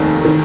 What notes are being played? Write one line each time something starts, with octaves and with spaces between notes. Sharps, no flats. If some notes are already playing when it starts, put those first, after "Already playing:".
Already playing: F1 D#2 D#3
D#3